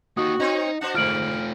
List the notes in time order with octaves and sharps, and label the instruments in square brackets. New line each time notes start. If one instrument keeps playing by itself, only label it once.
[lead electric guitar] A#3 D#4 [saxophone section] F#4 [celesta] D#6
[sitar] C4 C5 C#5 [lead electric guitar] D#4 [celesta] D#5
[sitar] D4 F#4 C5 [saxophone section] F#5
[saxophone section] G#2 [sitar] D3 [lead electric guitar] A3 F4 [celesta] F6 D7 F#7